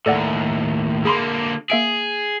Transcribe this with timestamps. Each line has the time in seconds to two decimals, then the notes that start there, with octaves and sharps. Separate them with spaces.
0.06 D#2 A2 A4 D5 F#5
1.05 D3 A#3 G#4 B5 C6
1.70 A#3 G#4 E5 D7